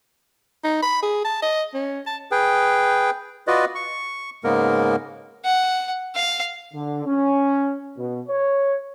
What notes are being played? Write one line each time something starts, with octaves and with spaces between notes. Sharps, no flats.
D#4
B5
G#4
A5
D#5
C#4
A5
G#4 B4 G5
F4 F#4 B4 D5 D#5
C#6
G#2 C#3 G#3 A#3 B3 A#4
F#5
F5
D3
C#4
B2
C#5